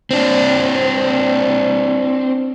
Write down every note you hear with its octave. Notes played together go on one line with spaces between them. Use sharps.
C4 D4